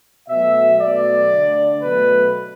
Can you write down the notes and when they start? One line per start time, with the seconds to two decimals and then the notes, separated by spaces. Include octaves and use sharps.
0.29 B2 F#3 A3 E5
0.80 B2 F#3 A3 D5
1.31 D3 A3
1.82 B2 F#3 A3 B4